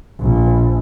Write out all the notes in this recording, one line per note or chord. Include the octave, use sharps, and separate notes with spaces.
A#1